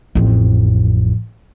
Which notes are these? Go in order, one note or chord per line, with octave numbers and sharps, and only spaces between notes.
A1 F2